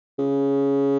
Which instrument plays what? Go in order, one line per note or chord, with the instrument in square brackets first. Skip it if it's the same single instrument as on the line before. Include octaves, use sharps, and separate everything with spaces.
[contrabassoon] C#3